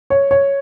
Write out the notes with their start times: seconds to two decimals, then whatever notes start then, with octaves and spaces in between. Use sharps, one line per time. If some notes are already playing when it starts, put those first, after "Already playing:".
0.10 C#5
0.31 C#5